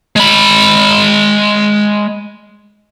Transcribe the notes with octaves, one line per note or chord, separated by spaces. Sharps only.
G#3 B5